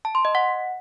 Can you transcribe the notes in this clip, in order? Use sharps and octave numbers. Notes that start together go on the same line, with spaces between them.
A5
C6
D#5
F#5